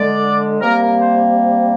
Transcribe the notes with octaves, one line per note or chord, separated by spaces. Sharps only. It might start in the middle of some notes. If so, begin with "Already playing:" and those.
Already playing: D3 G#3 D5
C3 G3 A#3 A#4
A#4
C5